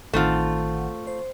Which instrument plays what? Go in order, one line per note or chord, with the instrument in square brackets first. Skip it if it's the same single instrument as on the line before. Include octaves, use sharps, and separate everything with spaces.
[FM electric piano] A1 D#3 F#5 [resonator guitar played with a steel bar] A3 C4 F4
[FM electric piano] C5